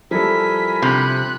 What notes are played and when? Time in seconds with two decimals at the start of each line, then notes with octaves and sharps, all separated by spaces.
0.11 F3 G3 E4 A4 A#4 G#5 B6
0.82 C3 B5 F#6